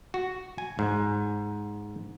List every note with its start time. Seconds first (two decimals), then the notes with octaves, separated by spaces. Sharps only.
0.14 F#4
0.58 G#5
0.79 G#2